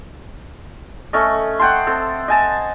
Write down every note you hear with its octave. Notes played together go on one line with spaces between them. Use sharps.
A3 C#4 A4 D#5
F#5 G5 A5 C6
C4 A4
D#5 G#5 A5